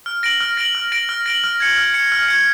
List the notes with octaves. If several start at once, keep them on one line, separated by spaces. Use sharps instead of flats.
F6
A#6 D7 F#7
F6
A#6 D7 F#7
F6
A#6 D7 F#7
F6
A#6 D7 F#7
F6
G#6 C#7
F6
G#6 C#7
F6
G#6 C#7